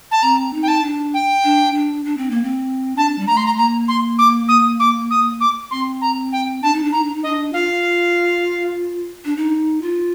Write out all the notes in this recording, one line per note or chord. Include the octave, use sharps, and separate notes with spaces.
A5
C4 A#5
D#4
G5
A5
D4
G5
D4
D4
D4
C4
A#3
C4
D4 A5
G3
A3 A#5
C6
A#5
A#3 A#5
C6
D6
D#6
D6
D#6
D6
C4 C6
A#5
G5
D4 A5
D#4
D4
D#4 A#5
D4
D#4
D4 D#5
F4 F5
D4
D#4
F4